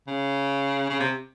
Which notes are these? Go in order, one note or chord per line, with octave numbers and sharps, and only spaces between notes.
C#3
C#3
C3